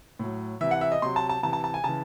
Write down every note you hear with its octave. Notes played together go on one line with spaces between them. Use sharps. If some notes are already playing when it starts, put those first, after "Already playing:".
A2 F#3
C3 E3 E5
F#5
E5
D#5
C3 F#3 C6
A5
A5
C3 E3 A5
A5
A5
G#5
C#3 E3 A5